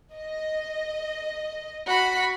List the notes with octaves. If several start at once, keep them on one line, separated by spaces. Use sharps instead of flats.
D#5
F#4 B5